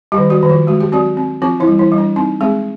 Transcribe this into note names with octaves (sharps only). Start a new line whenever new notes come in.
G3 G4
D#3
F#3 F#4
D#3
F3 F4
G#3 F#4
G4
F#3 C4 F#4
C4
F3 C4 F4
E3 E4
G3
E3 E4
G3
D4
C4 D#4
G#3 C4 G#4